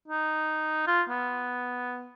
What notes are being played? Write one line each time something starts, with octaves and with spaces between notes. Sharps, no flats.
D#4
F4
B3